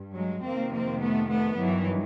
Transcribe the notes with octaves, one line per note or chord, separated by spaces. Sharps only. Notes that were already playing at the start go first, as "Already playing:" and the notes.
Already playing: G2
F#3 G#3
F2 C3 D#3 A#3 C4
A#3 C4
A3 B3
A3 B3
G2 D#3 E3 F#3